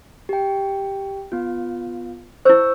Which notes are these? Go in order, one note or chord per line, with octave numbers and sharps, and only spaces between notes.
G4 G5
B3 F4
E4 C5 C#6 E6 G6